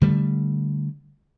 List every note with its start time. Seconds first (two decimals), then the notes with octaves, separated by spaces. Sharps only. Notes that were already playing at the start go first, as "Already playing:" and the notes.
0.01 D3 G3 A3